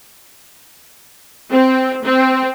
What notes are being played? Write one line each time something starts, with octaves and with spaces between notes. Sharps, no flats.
C4
C4